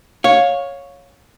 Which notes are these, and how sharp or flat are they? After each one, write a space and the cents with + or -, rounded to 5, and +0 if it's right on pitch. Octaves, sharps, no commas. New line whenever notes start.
C#5 +0 F5 +20